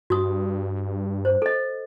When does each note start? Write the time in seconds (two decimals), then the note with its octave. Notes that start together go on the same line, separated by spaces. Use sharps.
0.10 G2 F#4 D#6
1.25 C5
1.42 A4 D#5